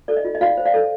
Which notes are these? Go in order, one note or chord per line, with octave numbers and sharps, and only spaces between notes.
A4 D5
D#5
F4
D#5
F4 D5 F5
C5
D5 F5
A4